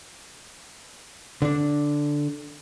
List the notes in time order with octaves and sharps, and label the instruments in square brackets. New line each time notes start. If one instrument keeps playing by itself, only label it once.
[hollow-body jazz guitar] D3 D4